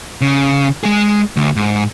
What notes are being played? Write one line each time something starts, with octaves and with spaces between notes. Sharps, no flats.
C#3
G#3 G#4
D2
G#2